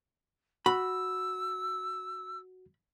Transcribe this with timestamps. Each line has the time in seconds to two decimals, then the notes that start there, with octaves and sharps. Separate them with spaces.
0.66 F#4 B5 E6